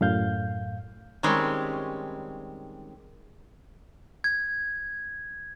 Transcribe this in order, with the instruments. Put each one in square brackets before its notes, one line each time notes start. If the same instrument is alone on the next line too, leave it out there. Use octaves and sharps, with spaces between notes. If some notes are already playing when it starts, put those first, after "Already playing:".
[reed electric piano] F#2 A2 F5 G6
[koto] D#3 G3 G#3 C4 C#4
[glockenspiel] G#6